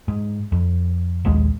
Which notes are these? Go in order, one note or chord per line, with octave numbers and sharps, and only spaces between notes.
G#2
F2
A#1 D#2 G#3